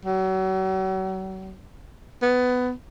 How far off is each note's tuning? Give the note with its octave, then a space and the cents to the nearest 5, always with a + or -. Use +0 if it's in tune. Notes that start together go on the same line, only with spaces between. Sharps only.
F#3 +40
B3 +15